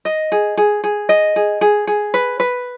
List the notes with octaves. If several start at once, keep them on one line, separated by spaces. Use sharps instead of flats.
D#5
G#4
G#4
G#4
D#5
G#4
G#4
G#4
B4
B4